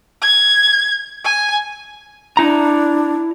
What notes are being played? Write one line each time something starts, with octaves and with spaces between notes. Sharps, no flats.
G#6
G#5
D4 E4 A#5